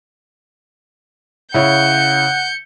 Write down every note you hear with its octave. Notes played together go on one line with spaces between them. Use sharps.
C#3 E4 C#5 F#5 G6 C#7